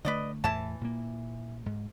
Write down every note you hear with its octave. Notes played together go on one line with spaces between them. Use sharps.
D3 A3 B4 D5 D#5
E2 A2 E3 E4 A5
A#2 A#3
G#2